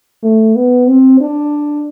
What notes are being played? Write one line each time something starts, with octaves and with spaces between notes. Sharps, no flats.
A3
B3
C4
D4